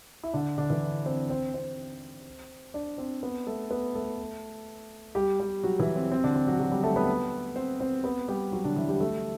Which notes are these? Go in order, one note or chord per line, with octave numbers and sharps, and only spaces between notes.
E4
D3 D4
D3 D4
E3 E4
C4 C5
C4 C5
C4 C5
D4 D5
C4 C5
B3 B4
A3 A4
B3 B4
A3 A4
G3 G4
G3 G4
F#3 F#4
E3 E4
C4
C4
D3 D4
C4
F#3 F#4
F#3 F#4
G3 G4
A3 A4
B3 B4
C4 C5
C4 C5
B3 B4
G3 G4
F#3 F#4
D3 D4
E3 E4
G3 G4
A3 A4